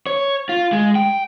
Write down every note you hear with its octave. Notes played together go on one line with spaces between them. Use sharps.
C#5
F4
G#3
G5